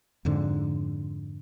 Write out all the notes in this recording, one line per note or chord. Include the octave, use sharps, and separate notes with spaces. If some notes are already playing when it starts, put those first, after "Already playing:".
F2 G#2 D3